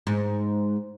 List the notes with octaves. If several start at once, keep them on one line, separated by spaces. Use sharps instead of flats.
G#2